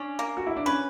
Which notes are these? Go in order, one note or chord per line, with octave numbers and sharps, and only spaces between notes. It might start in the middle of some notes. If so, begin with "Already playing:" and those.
Already playing: C#4 D4
A#3
F#4
E4
D4
C#4 B4